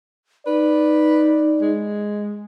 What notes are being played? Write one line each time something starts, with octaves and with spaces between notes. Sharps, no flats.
D#4 B4 D5
G#3